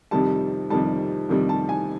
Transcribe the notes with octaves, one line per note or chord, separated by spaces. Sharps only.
F2 C3 D#3 G3 A5
F2 C3 D#3 G3 A5
F2 C3 D#3 G3
A5
G#5